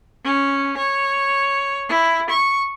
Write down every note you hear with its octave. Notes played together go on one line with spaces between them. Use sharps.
C#4
C#5
E4
C#6